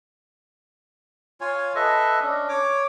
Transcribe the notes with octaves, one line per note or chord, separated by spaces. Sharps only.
F4 C#5 G#5
A4 B4 D#5 E5
C#4 D4
C#5 D6